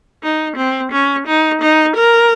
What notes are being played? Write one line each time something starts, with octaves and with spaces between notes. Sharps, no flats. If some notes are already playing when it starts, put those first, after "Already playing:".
D#4
C4
C#4
D#4
D#4
A#4